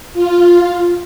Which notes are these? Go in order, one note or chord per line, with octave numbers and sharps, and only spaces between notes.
F4